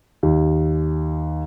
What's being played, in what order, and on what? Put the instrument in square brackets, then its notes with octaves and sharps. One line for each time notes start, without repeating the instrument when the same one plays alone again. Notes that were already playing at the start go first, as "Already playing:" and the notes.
[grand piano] D#2